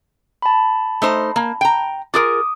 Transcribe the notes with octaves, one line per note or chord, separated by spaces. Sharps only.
A5 B5
A3 D#4 C5
A#3
G5 A#5
F4 G#4 A#4 D6 D#6